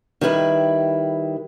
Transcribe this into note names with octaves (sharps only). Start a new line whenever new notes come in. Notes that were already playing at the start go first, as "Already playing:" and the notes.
D#3 G3 E4 B4